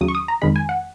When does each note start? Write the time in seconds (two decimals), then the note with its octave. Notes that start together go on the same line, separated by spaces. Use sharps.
0.01 D#2 C#3 F#3 D#6
0.08 C#6
0.15 D#6
0.28 A#5
0.42 F2 D#3 G#3 B5
0.56 G#5
0.69 F#5